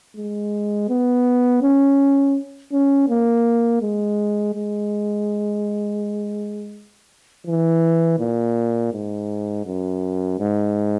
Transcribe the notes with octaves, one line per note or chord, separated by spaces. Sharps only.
G#3
B3
C#4
C#4
A#3
G#3
G#3
E3
A#2
G#2
F#2
G#2